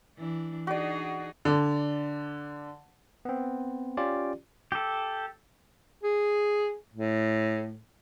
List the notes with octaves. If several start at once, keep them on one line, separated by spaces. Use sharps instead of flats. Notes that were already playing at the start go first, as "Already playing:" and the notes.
E3 D4
D4 D#4 F#4 G#4 D5
D3 D5
B3 C4
C#4 F4 G4 D5
G4 A4
G#4
A2